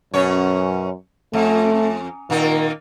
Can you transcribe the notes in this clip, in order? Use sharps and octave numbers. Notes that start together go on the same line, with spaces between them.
F#2 B2 C#4 C#5
F2 A3
A#2 D#3 A#3 D#4